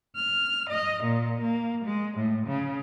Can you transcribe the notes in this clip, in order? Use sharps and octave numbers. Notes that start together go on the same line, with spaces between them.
F6
D#5
A#2
A#3
G#3
A2
C#3